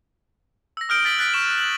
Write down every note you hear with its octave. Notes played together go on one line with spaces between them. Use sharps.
E6 A#6
D#6 F6 G6 D7 G7
A6 B6 F#7
F#6 A6 B6 D7
C#6 E7
F#7